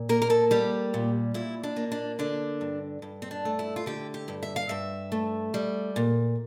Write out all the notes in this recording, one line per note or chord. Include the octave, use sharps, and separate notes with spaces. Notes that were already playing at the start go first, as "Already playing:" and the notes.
Already playing: A#2
A#3 A#4
A#4
A4
G3 G4
A#2
A#2 E4
D4
A#3
D4
D3 D4
G2
G2
C4
D4
A3
E4
F4
D3 G4
G4
G2
E5
F5
G2 E5
A3
G3
A#2